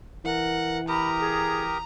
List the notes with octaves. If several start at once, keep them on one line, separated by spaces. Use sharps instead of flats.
E3 A#4 F#5
G4 A#4 A#5 B5 D#6
G#4